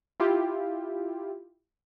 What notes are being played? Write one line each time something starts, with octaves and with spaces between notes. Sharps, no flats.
E4 F4 G4